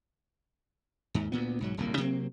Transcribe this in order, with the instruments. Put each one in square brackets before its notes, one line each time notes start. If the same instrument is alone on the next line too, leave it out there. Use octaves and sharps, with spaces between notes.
[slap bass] D#2 G#2
D2 A#2 B3
B1 G#2 F#3
D1 C2 F#2 A#3
C3 F#3 A#3 C4